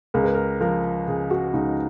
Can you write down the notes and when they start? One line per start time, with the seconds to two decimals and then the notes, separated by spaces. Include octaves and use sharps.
0.14 C#2 A#4
0.24 B4
0.35 A#4
0.61 F3 A#4
1.07 C#3 G#4
1.31 F#4
1.53 C#2 D#4